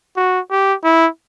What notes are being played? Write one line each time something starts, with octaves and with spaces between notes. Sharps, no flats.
F#4
G4
E4